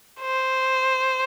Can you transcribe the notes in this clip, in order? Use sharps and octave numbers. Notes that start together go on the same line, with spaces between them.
C5